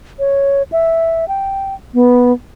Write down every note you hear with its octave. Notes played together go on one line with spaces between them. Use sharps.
C#5
E5
G5
B3